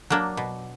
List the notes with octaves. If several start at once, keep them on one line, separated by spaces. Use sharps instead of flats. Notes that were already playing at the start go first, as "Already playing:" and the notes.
F#3 A#3 D4
B2